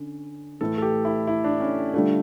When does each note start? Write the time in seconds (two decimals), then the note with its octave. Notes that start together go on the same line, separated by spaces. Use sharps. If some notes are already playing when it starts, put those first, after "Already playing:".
Already playing: D3 C#4
0.61 A2 E3 A3 A4
0.78 A4
0.82 G4
1.05 E4
1.27 E4
1.44 D4
1.60 C#4
1.94 D3 G3 A3 D4 F4